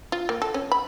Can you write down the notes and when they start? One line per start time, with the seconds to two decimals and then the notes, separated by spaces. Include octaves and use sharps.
0.12 F4
0.29 A#3
0.42 A4
0.54 C#4
0.72 B5